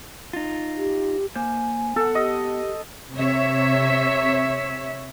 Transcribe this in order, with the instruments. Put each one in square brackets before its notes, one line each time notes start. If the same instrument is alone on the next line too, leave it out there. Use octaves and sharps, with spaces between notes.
[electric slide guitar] D#4 F4
[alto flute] G4
[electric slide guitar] A#3 C5 [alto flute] G#5
[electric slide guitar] B3 F#5 [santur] A4
[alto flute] G4 [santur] D#5
[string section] C3 C#5 E5